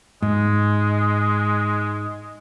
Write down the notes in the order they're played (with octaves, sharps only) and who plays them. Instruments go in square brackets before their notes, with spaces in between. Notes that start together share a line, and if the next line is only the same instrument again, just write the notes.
[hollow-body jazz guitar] G#2 [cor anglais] G#3